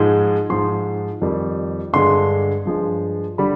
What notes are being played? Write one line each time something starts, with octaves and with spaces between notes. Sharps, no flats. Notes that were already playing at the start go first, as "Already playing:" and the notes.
Already playing: G#2 F3 G#3
G#2 F3 G#3 C6
F2 D#3 G3
G2 D3 G#3 C6
G2 F3 G#3
D3 G3 B5